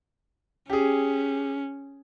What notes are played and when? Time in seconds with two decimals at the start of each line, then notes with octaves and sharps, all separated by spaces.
0.70 C#4 G4 G#4